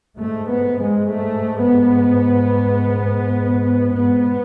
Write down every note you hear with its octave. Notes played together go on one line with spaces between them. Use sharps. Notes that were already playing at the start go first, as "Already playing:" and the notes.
G#2 A3
B3
G#3
A3
B3
G#2 B3